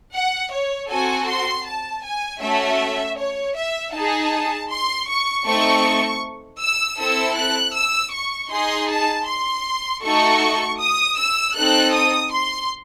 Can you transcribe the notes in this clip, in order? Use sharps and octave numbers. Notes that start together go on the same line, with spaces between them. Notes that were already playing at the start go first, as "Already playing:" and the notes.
F#5
C#5
C4 F#4 A4 G#5
C6
A5
G#5
A3 C#4 F#4 E5
C#5
E5
D#4 G#4 A5
C6
C#6
A3 C4 D#4 A4 C#6
E6
C4 E4 A4 E6
F#6
E6
C#6
D#4 G#4 C6
A5
C6
A3 D#4 F#4 A4 C#6
D#6
E6
C4 D#4 A4 F#6
D#6
C6